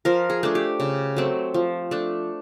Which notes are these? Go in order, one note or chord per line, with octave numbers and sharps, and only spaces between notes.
F3 A#4
G#4
A3 D4
G4
C#3
F#3 A3 C4
F3
A3 D4